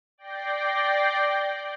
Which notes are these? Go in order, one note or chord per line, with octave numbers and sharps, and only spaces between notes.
D5 G5 G6 A#6 C7